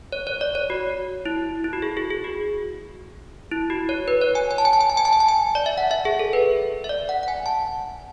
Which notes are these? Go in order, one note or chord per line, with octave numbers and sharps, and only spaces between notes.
C#5
C#5
D5
C#5
F#4
E4
E4
F#4
G#4
G#4
G#4
F#4
E4
F#4
C#5
B4
C#5
G#5
G#5
A5
G#5
A5
G#5
A5
G#5
A5
G#5
A5
G#5
D5
E5
F#5
E5
G#4
A4
B4
E5
D5
F#5
F#5
G#5
A5